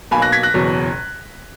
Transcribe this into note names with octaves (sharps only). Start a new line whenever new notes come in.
B1 B2 A#3 G#5 B5
F#6 A#6
G#6 B6
F#6 A#6
F#1 E2 B2 F#3